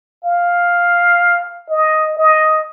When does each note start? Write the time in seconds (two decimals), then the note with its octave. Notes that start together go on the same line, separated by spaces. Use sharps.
0.24 F5
1.70 D#5
2.18 D#5